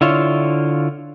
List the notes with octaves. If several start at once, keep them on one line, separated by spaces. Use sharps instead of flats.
D3 E4 F4 C#5